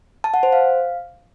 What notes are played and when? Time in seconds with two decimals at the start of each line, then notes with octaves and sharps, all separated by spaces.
0.24 A5
0.34 F#5
0.43 C5
0.53 F5